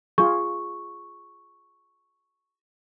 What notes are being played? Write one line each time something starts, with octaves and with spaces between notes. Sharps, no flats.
F4 G#4 C#6